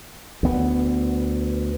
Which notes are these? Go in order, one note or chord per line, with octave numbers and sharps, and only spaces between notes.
D2 B3